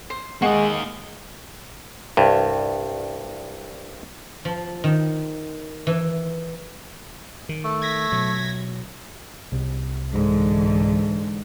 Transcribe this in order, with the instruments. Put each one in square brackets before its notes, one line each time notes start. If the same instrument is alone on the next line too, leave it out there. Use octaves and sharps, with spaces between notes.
[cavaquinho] C5
[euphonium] G#3 [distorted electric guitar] A#3 D#5 [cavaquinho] F#5 C#6
[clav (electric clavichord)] C2 G2
[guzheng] F3
D#3
E3
[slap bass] D#3
[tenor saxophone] A3
[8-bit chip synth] G#6 A#6 B6
[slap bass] B2 F#3
[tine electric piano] C2 C3
[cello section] G#2 D3 E3